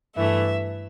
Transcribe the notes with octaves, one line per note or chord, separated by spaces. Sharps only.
G2 E3 A3 E5